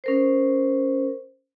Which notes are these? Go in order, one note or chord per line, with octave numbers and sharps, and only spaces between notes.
C#4 A#4 C5